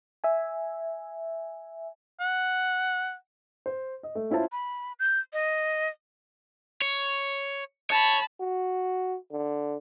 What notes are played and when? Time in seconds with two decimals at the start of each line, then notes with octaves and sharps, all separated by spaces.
0.24 E5 G#5
2.20 F#5
3.66 C5
4.03 D#5
4.15 A3
4.31 C#4 E4 F4 C5 A5
4.52 B5
4.99 G6
5.33 D#5
6.82 C#5
7.90 C#5 A5 B5
8.40 F#4
9.31 D3